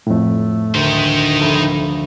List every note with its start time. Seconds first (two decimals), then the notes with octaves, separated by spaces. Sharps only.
0.07 F2 A2 A3
0.75 D2 D#3 D#4 C5
1.40 F1 A4 B5